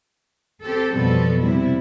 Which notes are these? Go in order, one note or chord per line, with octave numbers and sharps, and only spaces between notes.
C4 G4 A4
F2 B2 F3 G3 B3 A4
C3 G3 E4